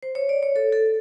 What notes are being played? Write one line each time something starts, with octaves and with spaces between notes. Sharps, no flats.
C5
C#5
D5
C#5
A4
A4